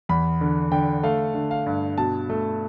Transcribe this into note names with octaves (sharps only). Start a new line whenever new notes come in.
E2 B5
D3
D3 G5
A3 F5
D3
F5
G2
B2 A5
A3